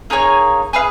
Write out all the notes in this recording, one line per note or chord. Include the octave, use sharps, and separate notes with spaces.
A#3 D#4 G#4 C#5
G#4 B4 F5